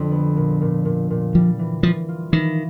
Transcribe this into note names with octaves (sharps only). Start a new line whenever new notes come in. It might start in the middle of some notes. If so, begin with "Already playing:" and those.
Already playing: F2 D3
B3
A#2
A#2
A#2
A#2
F3 G3
E3
E3 F3
F4
D#3 E3